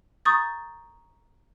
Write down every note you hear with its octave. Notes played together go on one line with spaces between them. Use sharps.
A#5 C#6 D#6 G6 A6